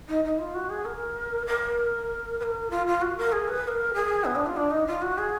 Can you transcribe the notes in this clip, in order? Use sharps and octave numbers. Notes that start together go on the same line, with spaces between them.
D#4
D#4
F4
F#4
G#4
A#4
A#4
B4
A#4
F4
F4
F#4
A#4
G#4
B4
B4
A#4
G#4
B3
D4
F4
D4
D#4
F4
F#4
G#4